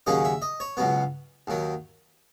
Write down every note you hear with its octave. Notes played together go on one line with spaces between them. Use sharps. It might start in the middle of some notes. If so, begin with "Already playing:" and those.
D#2 C#3 F#3 A#3 C#4 D#5
E5
D#5
C#5
C#2 B2 F#3 B3
D#2 D#3 F#3